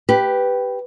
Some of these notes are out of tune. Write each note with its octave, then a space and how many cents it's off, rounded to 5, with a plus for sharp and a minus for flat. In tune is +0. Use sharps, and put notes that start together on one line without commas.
G4 +0 B4 +0